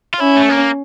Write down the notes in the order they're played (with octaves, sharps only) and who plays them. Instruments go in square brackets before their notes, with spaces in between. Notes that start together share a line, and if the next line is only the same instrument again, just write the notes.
[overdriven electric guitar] F4
[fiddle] C#4 [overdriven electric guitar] E4
[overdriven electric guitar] A3
A#3